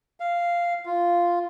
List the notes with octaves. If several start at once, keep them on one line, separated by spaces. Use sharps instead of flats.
F5
F4